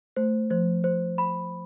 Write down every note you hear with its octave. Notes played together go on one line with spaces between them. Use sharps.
A3 C5
F3 C5
C5
B5